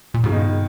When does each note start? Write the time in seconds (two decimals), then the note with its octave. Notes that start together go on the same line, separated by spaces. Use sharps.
0.14 A#2
0.24 G#2 C#3
0.32 G2 B2 D#3